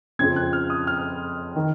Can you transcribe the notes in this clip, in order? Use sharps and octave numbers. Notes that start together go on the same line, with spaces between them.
F2 C#3 F3 C4 G#6
F#6
F6
D#6
F6
D#3